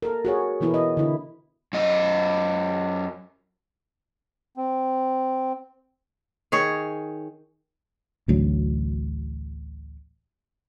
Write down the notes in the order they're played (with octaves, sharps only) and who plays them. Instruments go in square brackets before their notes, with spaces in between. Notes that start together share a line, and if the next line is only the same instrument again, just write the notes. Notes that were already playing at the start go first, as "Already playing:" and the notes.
[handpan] A4 A#4
F#4 G#4 C#5
B2 E3 B3 E4 A4 A#4
D#5
D3 E4
[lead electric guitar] F#2 D#5
[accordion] C4
[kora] D#3 G#4 C#5
[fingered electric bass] A1 D2 F#3